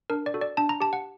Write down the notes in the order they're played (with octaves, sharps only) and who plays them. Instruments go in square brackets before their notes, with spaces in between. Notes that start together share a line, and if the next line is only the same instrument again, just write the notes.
[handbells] D4 A#4
D5
F#4 A4
D5
D4 A5
A#5
G4 A5
F#5